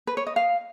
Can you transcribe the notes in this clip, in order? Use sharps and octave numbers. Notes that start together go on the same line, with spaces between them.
B4
C#5
D#5
F5